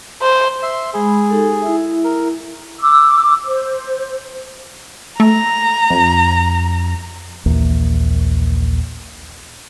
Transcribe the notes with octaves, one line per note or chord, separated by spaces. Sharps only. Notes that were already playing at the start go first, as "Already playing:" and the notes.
C5
E5 C6
G#3 G#4 B5
D#4 G4 A4
E4 E5
A#4
D6 E6
C5
A3 A#5
F2
A#1 D#2 E3 A#3